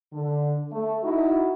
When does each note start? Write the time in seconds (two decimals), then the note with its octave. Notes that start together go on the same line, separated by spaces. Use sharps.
0.12 D3
0.72 A3
1.03 D#4 E4 F#4